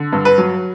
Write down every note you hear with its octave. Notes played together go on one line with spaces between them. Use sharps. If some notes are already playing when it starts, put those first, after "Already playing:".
Already playing: D3
G2
B4
F#3